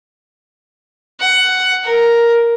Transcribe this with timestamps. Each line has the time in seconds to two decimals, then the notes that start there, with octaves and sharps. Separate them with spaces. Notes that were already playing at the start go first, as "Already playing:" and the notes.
1.20 F#5
1.83 A#4